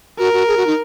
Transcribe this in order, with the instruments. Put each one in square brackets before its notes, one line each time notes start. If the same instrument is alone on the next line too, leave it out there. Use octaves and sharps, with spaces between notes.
[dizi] F#4 [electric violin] A#4
[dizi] F#4
G#4
F#4
D#4